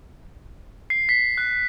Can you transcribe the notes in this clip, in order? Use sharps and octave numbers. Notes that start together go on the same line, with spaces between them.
C7
B6
F#6